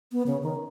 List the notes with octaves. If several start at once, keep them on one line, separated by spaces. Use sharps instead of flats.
B3
C#3
D#3